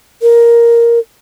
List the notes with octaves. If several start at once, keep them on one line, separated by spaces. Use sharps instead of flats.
A#4